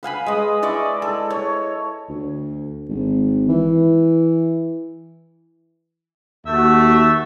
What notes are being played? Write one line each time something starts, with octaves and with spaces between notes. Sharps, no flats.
B4 F5 G#5 B5
G#3 D#5
E4 D5 D#5 C#6
A4
C#5
D2
G#1
E3
D#2 A3 F#4 E5